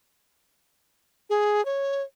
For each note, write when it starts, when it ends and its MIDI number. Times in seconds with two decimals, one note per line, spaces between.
1.30 1.64 68
1.65 2.02 73